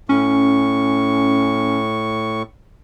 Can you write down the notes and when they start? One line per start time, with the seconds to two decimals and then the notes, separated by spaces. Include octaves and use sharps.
0.09 A2 C#4 C#6